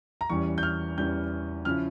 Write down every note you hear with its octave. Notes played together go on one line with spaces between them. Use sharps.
A#5
E2 E3 G3 C#4 C#6
G6
F6
E2 E3 G3 C#4 G6
C#3 F3 C#4 E4 F6